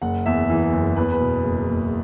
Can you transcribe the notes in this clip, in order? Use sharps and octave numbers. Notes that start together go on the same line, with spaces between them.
F#1 F#5
E2 E5
E3
F#1
E2 B4
B4
B2
F#1
F#1